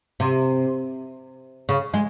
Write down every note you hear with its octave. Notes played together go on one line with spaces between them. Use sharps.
C3
C#3
G#3